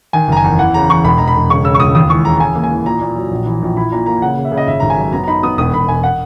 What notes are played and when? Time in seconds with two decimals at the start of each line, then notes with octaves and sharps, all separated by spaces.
0.13 D#3 G#5
0.28 F#1 A#5
0.37 G#5
0.44 E2
0.59 E3 F#5
0.74 C#3 A#5
0.89 E3 C#6
1.04 E1 B5
1.18 E1 A#5
1.28 B5
1.35 E1
1.49 C#3 C#6
1.64 C#3 E6
1.74 C#6
1.80 C#2 D#6
1.95 D#2 D#6
2.10 E3 C#6
2.25 C#3 A#5
2.37 A#5
2.40 E3 G#5
2.55 A#3
2.63 G#5
2.70 E3
2.86 A#2 A#5
3.01 A#2
3.16 F#3
3.31 A#1
3.46 E3
3.62 A#1
3.77 E4 B5
3.92 A#2 A#5
4.06 A#3 A#5
4.22 C#3 F#5
4.37 C#3
4.45 E5
4.52 C#3
4.57 D#5
4.67 G#1 E5
4.80 G#1 A#5
4.90 G#5
4.98 F#2
5.13 B3 A#5
5.23 A#5
5.27 D#4 B5
5.43 B3 D#6
5.58 E1 D#6
5.73 E1 B5
5.88 E1 G#5
6.03 F#5